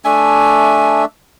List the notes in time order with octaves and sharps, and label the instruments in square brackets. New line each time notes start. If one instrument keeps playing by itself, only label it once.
[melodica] A3 D4 E5 [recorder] G#5